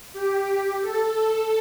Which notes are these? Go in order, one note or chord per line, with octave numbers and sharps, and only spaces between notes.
G4
A4